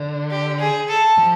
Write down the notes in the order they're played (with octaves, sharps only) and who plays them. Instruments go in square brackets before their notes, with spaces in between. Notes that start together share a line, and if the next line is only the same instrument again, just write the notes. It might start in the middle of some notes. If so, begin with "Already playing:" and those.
Already playing: [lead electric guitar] D3
[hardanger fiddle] G4
G#4
A4
[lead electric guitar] F3